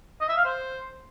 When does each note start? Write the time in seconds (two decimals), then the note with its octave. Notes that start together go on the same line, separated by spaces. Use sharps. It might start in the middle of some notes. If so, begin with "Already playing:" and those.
0.21 D#5
0.29 E5
0.37 F5
0.45 C5